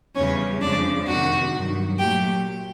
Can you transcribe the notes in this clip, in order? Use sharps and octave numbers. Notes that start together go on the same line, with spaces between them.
E2 C#3 E3 G3 C#4 C#5
F2 C#3 F3 G#3 D4 D5
F2 C3 D#3 F#4 F#5
G2 D#3 F#3
A#2 F#3 A3 G4 G5